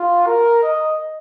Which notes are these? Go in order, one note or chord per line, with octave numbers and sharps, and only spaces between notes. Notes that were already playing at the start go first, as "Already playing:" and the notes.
Already playing: F4
A#4
D#5